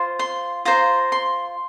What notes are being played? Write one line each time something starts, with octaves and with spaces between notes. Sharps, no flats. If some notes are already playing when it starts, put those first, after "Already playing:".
Already playing: F4 C5
C6
F4 C5 A#5
C6